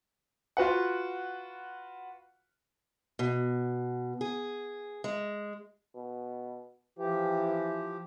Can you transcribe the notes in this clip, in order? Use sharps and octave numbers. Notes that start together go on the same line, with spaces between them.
F4 F#4 B4 F#5
B2
G#4
G#3
B2
E3 F3 G4